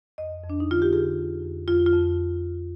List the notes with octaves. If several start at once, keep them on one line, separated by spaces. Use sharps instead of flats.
F2 D#5
F2
D4
D#4
D3 F4
G4
D3 G#4
F2
F2
F2 F4
F4
F2